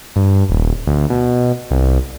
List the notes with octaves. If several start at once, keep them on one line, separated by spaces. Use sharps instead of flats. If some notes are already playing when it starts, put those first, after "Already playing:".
G2
D#1
D2
B2
C2